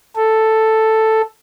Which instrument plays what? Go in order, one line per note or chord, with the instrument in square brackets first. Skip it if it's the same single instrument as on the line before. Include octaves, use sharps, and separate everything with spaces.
[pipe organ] A4